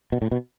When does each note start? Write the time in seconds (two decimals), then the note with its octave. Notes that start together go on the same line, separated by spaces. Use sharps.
0.12 B2
0.22 A2
0.31 B2